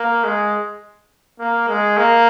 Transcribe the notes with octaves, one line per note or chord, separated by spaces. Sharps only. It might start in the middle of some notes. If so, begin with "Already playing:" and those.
Already playing: A#3
G#3
A#3
G#3
A#3